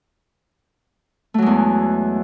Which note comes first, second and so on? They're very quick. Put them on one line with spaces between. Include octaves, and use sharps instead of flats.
A3 F#3 G#3 E2